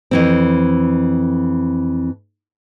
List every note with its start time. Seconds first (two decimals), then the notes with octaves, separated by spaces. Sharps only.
0.11 F2 E3 C4